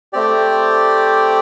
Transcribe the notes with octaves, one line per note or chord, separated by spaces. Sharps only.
A3 C4 G4 D5